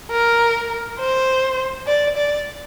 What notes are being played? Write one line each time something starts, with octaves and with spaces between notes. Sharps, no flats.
A#4
C5
D5
D5